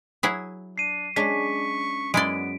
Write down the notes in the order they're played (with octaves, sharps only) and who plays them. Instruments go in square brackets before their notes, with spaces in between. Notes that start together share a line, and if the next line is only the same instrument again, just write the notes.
[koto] F#3 E4 G#4
[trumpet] D4 [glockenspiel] C7 D#7
[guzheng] G#3 C#4 D4 [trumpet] C#6 [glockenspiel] B6
[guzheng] F#2 [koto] G#3 E4 D5 [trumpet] B3 [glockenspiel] D7